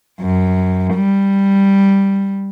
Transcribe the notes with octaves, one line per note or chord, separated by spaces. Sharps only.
F#2
G3